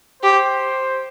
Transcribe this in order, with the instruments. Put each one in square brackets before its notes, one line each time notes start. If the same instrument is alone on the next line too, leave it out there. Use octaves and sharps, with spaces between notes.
[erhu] G4 [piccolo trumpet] C5